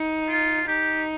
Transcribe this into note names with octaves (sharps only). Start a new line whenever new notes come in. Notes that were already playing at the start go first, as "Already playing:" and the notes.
Already playing: D#4
F4
D#4 G4